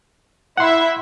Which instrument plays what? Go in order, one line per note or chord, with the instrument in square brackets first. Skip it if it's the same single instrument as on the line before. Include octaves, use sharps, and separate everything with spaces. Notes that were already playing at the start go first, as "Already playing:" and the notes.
[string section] E4 E5 [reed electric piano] F#5 C6